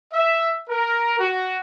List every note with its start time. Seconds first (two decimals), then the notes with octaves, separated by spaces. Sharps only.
0.13 E5
0.69 A#4
1.19 F#4